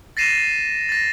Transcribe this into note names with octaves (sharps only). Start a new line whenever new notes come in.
A6 A#6 C7 D#7 E7
A6 A#6